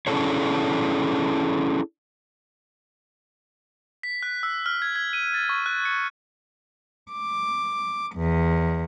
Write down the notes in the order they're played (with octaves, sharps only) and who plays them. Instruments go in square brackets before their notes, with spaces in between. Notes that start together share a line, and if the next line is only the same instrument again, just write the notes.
[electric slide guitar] C#4 D4 E4 G#4 A4 C#5
[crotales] B6
F#6
E6
F6
G#6
G#6
D#7
A6
C#6
F#6
C#7
[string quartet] D6
E2